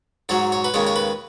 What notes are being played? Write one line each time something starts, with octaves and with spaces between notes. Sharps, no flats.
G#2 F#3 C#5
C#5
B4
D#2 C#3 G#3 C#5
C#5
B4